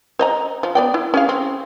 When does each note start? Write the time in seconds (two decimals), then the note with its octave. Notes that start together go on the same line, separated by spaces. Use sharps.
0.19 C5 D#5 A#5
0.63 F3
0.75 B3 D5 G5
0.94 E4
1.14 C#4 G#4 F5
1.29 C4